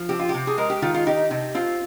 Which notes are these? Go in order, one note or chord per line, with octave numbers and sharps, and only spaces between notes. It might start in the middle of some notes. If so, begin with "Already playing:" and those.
Already playing: F3
C4 G4
F4
G4
C3
G#4
G#3 A#4
G4
D#3 F4
F4
D#4 G4
C3
C4 F4